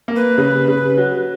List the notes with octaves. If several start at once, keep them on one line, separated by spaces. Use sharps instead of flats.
A#3
B4
C#3
C#3
F#3